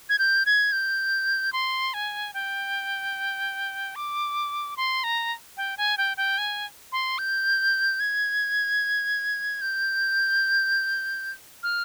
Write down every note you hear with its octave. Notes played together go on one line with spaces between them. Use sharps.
G#6
G6
G#6
G6
C6
G#5
G5
D6
C6
A#5
G5
G#5
G5
G5
G#5
C6
G6
G#6
G6
F6